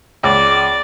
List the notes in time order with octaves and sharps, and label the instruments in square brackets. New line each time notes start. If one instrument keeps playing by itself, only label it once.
[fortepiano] C#2 [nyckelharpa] D5